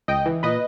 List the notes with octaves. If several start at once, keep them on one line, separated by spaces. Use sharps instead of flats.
C#2 D#5 G5
E3
A#2 B4 D#5